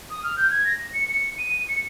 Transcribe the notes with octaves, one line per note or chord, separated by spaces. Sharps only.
D#6
F6
G6
G#6
A#6
C#7
C#7
D#7
C#7